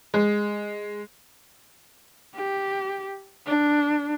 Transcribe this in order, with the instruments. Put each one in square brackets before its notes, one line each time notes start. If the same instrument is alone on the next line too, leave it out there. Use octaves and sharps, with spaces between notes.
[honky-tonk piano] G#3
[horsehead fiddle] G4
D4